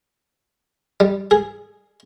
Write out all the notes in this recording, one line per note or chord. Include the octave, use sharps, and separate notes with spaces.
G3
G#4